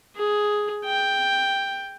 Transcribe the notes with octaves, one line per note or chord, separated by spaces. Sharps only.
G#4
G5